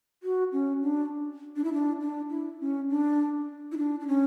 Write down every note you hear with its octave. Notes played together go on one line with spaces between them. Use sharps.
F#4
C#4
D4
D4
E4
D4
D4
E4
C#4
D4
E4
D4
D4
C#4